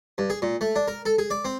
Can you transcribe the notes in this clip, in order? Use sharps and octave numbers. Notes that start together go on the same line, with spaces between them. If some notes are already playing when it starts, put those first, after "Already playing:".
G2
G#4
A#2
A3
D4
A#4
A4
G#4
D5
C4